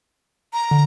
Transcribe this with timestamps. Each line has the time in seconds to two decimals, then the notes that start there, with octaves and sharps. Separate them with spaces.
0.53 A#5
0.71 D3